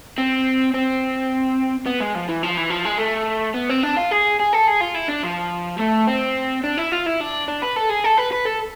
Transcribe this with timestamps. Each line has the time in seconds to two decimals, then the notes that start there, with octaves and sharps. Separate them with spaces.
0.18 C4
0.74 C4
1.86 B3
2.00 G#3
2.15 F3
2.29 E3
2.43 F3
2.57 E3
2.70 F3
2.85 G#3
2.98 A3
3.54 B3
3.69 C4
3.83 D4
3.97 F4
4.11 G#4
4.40 G#4
4.53 A4
4.68 G#4
4.81 F4
4.95 E4
5.09 D4
5.24 F3
5.79 A3
6.08 C4
6.64 D4
6.78 E4
6.92 F4
7.07 E4
7.21 D4
7.48 D4
7.62 B4
7.76 A4
7.90 G#4
8.04 A4
8.18 B4
8.33 B4
8.46 A4